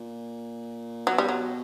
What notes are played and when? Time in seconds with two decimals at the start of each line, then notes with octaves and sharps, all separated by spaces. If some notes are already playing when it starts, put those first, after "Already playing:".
Already playing: A#2
1.07 B2 F#3
1.18 G3
1.28 F#3